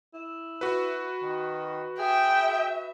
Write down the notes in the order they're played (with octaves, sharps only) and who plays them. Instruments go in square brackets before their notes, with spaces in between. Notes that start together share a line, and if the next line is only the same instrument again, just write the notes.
[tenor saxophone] E4
[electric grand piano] F#4 B4
[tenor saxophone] D#3
[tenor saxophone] G#4 [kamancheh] E5 [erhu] G5